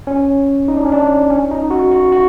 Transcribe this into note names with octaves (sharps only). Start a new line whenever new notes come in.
C#4
D#4
D4
C#4
D4
C#4
D#4
F#4
F#4
F#4